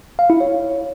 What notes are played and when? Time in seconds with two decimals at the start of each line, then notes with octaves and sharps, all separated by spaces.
0.19 F5
0.30 E4
0.41 C#5